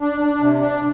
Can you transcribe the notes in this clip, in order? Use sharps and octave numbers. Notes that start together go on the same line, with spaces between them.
D4
D4
C3
D4